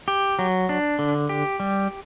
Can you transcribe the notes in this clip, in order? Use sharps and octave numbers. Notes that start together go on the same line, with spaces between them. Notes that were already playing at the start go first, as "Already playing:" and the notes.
G4
F#3
D4
D3
G4
G3